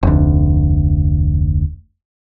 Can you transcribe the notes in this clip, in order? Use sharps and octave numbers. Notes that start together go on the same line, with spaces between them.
F1 D2